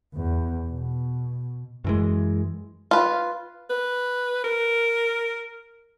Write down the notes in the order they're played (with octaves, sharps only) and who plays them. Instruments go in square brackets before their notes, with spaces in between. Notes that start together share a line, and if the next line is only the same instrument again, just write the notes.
[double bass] E2
B2
[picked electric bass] F#2 E3 G#3
[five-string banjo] F4 B4
[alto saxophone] B4
A#4